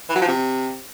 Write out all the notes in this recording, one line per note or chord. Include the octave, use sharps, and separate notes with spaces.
E3
F#3
F3
C3